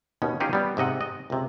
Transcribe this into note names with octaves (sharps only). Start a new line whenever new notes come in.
D#2 B2 C#4
C#4 D#4 F4 G4 G#4
G3 B3
G#2 C3 D#5 F#5
D#5
C#2 C3